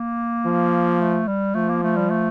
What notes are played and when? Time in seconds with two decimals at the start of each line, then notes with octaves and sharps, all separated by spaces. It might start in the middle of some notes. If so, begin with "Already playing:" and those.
Already playing: A#3
0.45 F3
1.00 A3
1.27 G3
1.55 F3 A3
1.69 A#3
1.83 A3
1.97 G3
2.10 A3